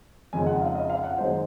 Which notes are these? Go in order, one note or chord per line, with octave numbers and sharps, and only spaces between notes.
F2 C#3 G#3 D#4 G#5
F#5
F5
D#5
F5
F#5
F#2 D#3 G#3 D#4 C5